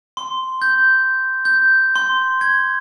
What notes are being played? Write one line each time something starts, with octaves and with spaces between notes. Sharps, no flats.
C6
G6
G6
C6
G#6